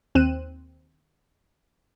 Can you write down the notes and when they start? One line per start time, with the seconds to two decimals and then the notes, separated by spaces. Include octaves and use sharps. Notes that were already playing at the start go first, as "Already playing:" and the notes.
0.15 D#2 C4 F#6 D#7 E7